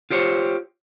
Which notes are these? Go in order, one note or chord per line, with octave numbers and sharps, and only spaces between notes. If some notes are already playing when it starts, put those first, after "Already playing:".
F4 G4 C5 C#5